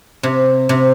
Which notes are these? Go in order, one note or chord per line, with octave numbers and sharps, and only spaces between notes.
C3
C3